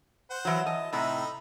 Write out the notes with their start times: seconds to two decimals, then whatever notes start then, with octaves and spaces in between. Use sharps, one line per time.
0.30 C5 F#5
0.45 E3 F#3
0.66 D#5 A5
0.93 A2 C3 D#4 E5 B5